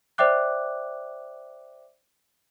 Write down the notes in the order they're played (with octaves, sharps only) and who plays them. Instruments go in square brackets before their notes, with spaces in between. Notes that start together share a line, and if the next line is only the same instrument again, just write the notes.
[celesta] C5 D5 E5 G5 D6 F#6